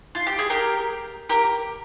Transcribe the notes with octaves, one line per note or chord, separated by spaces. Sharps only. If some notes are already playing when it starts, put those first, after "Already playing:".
F4
G4
G#4
G4 A#4
G4 A#4